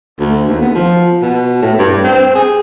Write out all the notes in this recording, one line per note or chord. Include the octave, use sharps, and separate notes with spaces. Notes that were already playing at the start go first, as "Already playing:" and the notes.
D2
D#2
B3
F3
B2
A2
G2
C4
G#4